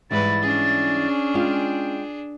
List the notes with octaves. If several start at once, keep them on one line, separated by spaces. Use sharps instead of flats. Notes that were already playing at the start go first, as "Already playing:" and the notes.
G#2 E3 G3 E4 B4 A6
C#4 D4 G#4
G#3 F4 G5